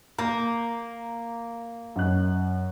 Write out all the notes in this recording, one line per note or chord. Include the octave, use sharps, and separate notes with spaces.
A#3 A#5 G6
F#2 D#5 F#6